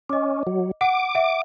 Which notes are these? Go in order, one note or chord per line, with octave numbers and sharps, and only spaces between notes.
C#4 D#5 D6
F#3
F#5 D6
E5 F#5